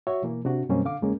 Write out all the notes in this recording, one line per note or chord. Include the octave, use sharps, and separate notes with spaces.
F#4 C#5 E5
B2 E3 A#3
C3 D4 F#4
F#2 B2 G3 A#3 C4 C#4
D3 F5 D6
E2 C#3 G#3 A#3 C#4